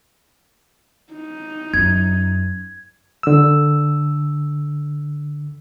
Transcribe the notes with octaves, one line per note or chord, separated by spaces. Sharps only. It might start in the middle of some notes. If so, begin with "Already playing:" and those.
D#4
F#2 G#6
D3 E6